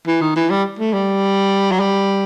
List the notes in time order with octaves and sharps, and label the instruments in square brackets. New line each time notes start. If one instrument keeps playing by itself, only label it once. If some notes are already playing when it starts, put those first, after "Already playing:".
[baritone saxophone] E3
D#3
E3
G3
A3
G3
F#3
G3